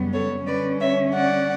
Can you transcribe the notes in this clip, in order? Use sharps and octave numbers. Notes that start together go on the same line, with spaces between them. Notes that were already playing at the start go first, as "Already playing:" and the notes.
Already playing: F#2 C#3 G3 B3
A4 C#5
D3 G3 C#4 B4 D5
C#5 E5
D5 F#5